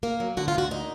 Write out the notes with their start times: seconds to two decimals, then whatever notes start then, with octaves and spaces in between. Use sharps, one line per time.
0.03 A#3 A#4
0.20 F#3
0.37 D3 F#4
0.48 F4
0.54 D2 F#4
0.71 A#2 D#4